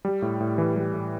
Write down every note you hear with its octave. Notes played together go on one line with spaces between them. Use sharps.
G3
A2
A2
E3
G3
A2